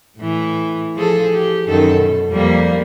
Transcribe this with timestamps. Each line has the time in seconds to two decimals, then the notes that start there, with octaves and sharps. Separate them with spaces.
0.18 A2 E3
0.95 F3 G#4 A4
1.33 G4
1.67 F#2 D#3 A4
1.97 B2
2.30 F2 G3 A#3